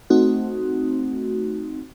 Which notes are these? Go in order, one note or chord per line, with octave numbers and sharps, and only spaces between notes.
A3 C4 D#4 F#4